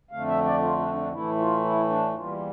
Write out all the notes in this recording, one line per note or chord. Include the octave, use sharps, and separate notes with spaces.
F2 D3 A3 F5
E5
D5
F4
D4
D4
A2 E3 A3 E4
F4
E4
D4
E2 E3 G3 A#3 F4